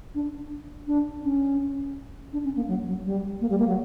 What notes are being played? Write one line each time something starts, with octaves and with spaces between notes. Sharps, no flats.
D4
D4
C#4
D4
C#4
A#3
F#3
F#3
G3
A#3
G3
A#3
F#3